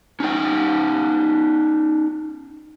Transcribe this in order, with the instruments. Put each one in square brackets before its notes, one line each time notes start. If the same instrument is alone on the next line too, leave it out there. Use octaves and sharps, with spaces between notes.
[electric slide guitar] C#4 D#4 G5